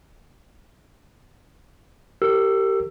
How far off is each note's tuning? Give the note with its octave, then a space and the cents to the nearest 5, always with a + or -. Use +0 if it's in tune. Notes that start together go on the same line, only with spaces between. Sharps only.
G4 -15 A#4 -35 E6 +20